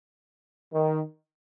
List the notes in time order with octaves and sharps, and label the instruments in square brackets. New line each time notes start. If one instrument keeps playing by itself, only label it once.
[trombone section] D#3